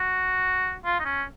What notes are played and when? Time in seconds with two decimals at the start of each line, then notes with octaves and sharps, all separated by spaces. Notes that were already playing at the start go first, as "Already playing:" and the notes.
Already playing: F#4
0.85 F4
1.00 D#4
1.05 C#4